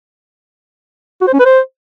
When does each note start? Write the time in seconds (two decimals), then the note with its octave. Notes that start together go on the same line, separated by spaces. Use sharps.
1.21 F#4
1.27 C5
1.33 C#4
1.39 B4
1.45 C5